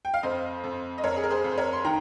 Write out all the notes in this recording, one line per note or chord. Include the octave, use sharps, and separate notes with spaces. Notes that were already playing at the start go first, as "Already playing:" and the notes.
G5
F5
F2 C5 D#5
F2
D#5
F2 A#4 C#5
G#4
A#4
G#4 C5
F2
C5
A#4 C#5
C6
D#3 G5 A#5